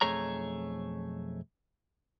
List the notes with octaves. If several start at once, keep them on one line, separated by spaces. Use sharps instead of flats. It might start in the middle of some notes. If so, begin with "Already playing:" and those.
B1 F2 A3 G#4 C#5 A#5